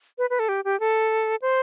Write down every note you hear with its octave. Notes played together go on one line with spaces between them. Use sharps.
B4
B4
A4
G4
G4
A4
C5